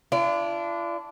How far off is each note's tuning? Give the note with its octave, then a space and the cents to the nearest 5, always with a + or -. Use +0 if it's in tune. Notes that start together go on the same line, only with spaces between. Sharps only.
D4 -10 F4 -45